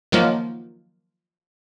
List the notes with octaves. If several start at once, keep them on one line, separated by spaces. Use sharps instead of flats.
D#3 F3 F#3 A#3